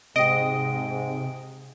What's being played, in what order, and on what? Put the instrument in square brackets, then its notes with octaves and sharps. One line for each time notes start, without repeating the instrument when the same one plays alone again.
[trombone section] G#2 [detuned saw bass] C3 [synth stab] D#5 [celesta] G5 D7